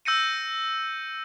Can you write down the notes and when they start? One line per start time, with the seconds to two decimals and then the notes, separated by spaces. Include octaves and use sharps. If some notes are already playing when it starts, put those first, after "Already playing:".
0.05 E6 G6 A#6 C#7 D#7